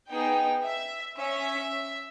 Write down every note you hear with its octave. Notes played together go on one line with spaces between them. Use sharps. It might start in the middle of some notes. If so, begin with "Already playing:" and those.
B3 D#4 G#4 G5
E5
C#4 E5